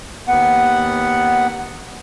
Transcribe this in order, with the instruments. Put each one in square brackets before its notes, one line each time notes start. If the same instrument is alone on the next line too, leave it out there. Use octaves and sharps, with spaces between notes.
[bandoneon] D#2 B3 F#5